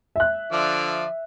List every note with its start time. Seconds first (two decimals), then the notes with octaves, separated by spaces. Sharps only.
0.16 E5 F#6
0.52 D3 F3 D5